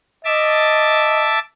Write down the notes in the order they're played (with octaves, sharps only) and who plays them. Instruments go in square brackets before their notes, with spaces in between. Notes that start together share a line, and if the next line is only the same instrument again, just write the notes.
[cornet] D#5 [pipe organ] E5 A5 D6